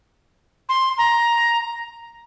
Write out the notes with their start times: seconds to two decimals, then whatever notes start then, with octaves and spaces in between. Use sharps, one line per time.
0.69 C6
0.98 A#5